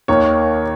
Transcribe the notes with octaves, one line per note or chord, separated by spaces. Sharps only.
D#2 D#3 A#3 C#5